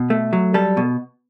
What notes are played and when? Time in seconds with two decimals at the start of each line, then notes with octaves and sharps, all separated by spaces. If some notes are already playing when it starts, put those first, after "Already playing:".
Already playing: B2
0.10 A3
0.33 F#3
0.54 G3 A4
0.77 B2